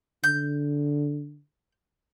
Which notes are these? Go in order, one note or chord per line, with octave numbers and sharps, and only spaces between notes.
D3 G6